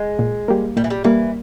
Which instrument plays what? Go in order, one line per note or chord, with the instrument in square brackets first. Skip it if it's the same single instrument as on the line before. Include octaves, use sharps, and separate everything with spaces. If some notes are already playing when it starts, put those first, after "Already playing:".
Already playing: [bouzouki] G#3
[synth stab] A#2
G3 A#3
[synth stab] A#2 [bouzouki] G3
[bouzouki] E3
G3
[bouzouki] E3 [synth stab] G3 A#3